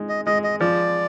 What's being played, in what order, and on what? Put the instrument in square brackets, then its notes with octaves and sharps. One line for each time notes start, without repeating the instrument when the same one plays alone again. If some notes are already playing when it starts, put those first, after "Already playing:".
Already playing: [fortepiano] G#3 D#4
[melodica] D#5
[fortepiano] G#3 [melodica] D#5
[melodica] D#5
[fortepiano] F3 [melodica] D5